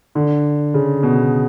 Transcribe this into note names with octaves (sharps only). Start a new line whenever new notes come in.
D3
C#3
B2